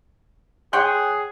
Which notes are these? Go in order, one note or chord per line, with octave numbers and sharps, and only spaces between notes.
G#4 C#5 F#5 G5 C6 F#6